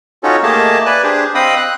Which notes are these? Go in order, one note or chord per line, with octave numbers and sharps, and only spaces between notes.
C#4 D#4 F4 F#4 A4 C#5
A3 A#3 G4 G#4 D#5 A5
B4 D5 G#5 F#6
D4 G4 G#4 C5
C4 D#5 F5 G5 B5 D#6
F#6